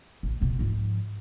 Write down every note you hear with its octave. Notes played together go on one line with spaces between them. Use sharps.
A1
C#2 B2
G#2 F3